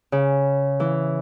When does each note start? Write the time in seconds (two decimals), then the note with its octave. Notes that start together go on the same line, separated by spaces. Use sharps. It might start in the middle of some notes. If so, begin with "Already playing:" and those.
0.12 C#3
0.80 E3